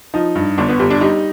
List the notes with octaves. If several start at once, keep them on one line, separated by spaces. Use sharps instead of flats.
F3 D#4
G2
G1 D4
B3
G1 G3
D4
G3 D#4